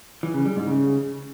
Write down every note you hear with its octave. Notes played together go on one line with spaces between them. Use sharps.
E3
C#3
G3
G#2
C#3